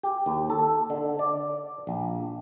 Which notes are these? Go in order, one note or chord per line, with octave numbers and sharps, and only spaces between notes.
G4
D#2
A4
D3
D5
A#1